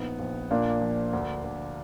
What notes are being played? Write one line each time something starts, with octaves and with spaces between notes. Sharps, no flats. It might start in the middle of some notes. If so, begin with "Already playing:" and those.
Already playing: A#1 B3 D#4
A#1
A#2 A#3 D4
F3
D2
D2